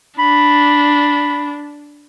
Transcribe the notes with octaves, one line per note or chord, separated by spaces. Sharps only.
D4 B5